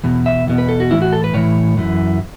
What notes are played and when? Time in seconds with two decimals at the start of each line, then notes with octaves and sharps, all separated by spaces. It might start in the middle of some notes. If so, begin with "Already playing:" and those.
0.04 E2 B2
0.26 E5
0.47 E2 B2
0.58 B4
0.69 A4
0.80 F#4
0.91 A2 E3 E4
1.02 F#4
1.13 A4
1.24 B4
1.34 A2 E3 C#5
1.77 F#2 E3